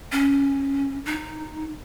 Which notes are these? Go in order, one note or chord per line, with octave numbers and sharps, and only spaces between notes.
C#4
D#4